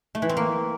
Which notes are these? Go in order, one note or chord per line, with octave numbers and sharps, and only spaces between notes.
A3
E3
C4
A#3